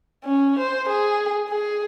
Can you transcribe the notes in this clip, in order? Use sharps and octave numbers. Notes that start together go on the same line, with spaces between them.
C#4
C5
G#4
G#4